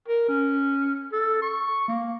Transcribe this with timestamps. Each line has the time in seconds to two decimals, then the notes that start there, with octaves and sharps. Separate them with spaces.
0.08 A#4
0.29 C#4
1.13 A4
1.42 C#6
1.88 A#3